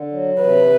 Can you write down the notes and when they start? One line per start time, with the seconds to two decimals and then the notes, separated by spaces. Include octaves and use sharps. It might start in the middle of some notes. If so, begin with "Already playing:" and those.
Already playing: D3
0.12 F#3
0.41 C3 B4